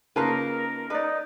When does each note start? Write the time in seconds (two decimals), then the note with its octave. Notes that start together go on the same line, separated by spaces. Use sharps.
0.16 C#3 A#3 D#4 F4 A#4 B4 A5
0.90 D#4 B4 D5